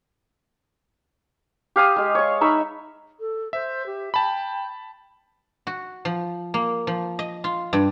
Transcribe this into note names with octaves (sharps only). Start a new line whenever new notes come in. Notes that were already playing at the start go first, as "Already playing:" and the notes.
G4 F5 G#5 D#6
G#3 G#4
C#5 C#6
D#4 E5 B5 C#6
A4
C5 E5
G4
G5 A5 B5
F#4
F3
A#3
F3
D#5
F4
G2